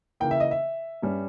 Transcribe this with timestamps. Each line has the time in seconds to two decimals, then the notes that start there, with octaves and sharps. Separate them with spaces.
0.20 C#3 E3 A#3 G5
0.31 E5
0.40 D#5
0.51 E5
1.02 G2 G3 C#4